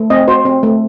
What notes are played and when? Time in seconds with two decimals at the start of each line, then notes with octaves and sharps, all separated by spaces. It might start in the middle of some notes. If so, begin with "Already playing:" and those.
Already playing: A3
0.10 C4 D#5
0.28 F#4 C5
0.45 C4
0.63 A3